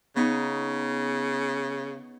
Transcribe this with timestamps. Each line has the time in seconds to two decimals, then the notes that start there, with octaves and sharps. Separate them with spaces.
0.16 C#3 B3 D#4 C#6